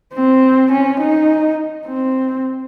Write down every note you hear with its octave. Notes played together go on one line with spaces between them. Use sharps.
C4
C#4
D#4
C4